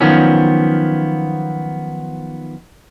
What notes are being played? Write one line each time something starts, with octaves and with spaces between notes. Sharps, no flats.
D#3 F3 F#3 B3 C#4